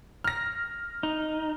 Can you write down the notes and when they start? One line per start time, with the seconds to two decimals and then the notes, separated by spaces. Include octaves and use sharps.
0.24 F6 A#6
1.03 D#4